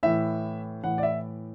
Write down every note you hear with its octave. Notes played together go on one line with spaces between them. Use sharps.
A2 E3 E5
A2 E3 F#5
D5
E5